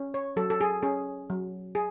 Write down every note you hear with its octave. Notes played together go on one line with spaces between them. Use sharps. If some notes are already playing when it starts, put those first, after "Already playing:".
Already playing: C#4
C#5
F#3 A4
A4
G#4
C#4 G#4
F#3
G#4